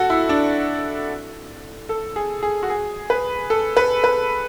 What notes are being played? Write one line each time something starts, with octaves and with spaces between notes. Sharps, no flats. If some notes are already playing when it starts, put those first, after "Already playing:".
Already playing: F#4 A4
E4
D4
A4
G#4
G#4
F#4
G#4
B4
A4
B4
B4